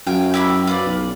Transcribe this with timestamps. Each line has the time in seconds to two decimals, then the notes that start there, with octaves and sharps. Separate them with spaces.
0.06 F#2 F5 G5 G#5
0.34 E4 G4 B5
0.67 F4 B4 D5
0.86 B1